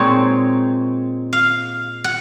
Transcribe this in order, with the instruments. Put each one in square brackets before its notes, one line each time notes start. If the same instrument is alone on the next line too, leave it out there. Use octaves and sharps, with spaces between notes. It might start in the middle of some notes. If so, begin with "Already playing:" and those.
Already playing: [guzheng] A#2 G#3 C4 D#4 C#5
F5
F#5